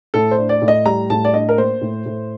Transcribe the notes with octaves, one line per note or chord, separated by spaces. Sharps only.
A2 A4
C5
D4
D5
A2
D#5
G3 A#5
A2 A5
D5
D4 D#5
A#4
A#3 C5
A2
A2